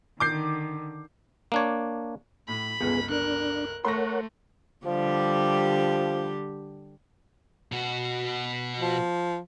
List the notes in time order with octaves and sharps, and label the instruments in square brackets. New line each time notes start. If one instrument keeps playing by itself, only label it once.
[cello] D3 D#3 [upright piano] D6 G6 C7
[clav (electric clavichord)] A#3 D4 C#5
[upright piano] A2 [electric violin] B5
[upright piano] G1 C#2 [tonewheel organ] B3 G#4
[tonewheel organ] D4 [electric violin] A#4 F#6
[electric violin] A3 [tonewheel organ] A#4 C#5 F#5 [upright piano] C6 C#6 A#6
[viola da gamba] D3 G3 G4 [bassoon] F3
[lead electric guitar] B2 F#4
[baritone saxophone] F3